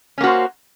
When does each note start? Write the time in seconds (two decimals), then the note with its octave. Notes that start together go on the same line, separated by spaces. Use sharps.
0.18 C#4
0.21 A#3
0.24 F#4
0.27 C5